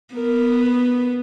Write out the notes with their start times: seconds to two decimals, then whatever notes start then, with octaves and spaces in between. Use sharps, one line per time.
0.15 B3 A#4
0.64 B4